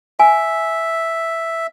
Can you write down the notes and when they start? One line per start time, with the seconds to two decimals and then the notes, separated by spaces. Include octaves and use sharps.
0.20 E5 G#5